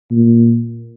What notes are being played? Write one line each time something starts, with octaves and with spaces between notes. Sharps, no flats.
A#2